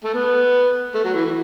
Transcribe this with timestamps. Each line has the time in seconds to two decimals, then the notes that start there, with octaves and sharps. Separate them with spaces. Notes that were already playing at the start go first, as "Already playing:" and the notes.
0.04 A3
0.14 B3
0.95 A3
1.04 F#3
1.14 E3
1.25 E3